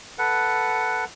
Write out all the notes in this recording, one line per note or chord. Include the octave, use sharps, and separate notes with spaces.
A4 B4 F#5